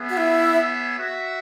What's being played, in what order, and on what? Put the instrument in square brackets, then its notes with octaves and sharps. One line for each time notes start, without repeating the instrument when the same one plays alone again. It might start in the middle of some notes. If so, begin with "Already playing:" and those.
Already playing: [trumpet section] B3 G#4 C#5 E5
[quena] F#4
E4
[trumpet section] F#4 E5